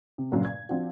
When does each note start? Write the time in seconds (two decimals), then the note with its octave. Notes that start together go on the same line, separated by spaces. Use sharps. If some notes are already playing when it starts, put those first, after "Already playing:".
0.18 C3
0.32 G2 A#2 C#3 F#3
0.45 G#6
0.69 F3 C4 D4 F#4